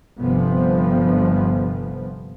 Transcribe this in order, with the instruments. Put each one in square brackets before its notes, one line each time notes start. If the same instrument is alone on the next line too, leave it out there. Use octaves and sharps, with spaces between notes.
[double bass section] G1 C3 F3 B3